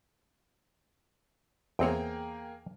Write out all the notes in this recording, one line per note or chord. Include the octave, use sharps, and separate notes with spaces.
E2 A#3 C4 G#4 C#5 G5